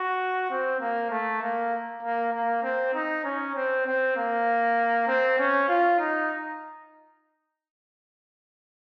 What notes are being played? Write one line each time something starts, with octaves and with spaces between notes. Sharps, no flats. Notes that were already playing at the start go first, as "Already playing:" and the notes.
Already playing: F#4
C4
A#3
A3
A#3
A#3
A#3
C4
D#4
C#4
C4
C4
A#3
C4
C#4
F4
D#4